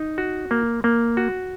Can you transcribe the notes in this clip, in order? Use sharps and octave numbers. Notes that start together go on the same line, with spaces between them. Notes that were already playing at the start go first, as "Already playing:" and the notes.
Already playing: D#4
F#4
A#3
A#3
F#4